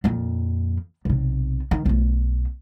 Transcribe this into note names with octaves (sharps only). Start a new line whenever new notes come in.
F2 A#2
B1 C3
D#3
B1 A3